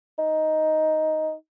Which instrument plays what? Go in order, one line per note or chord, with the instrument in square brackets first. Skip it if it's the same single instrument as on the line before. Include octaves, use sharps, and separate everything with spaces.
[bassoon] D#4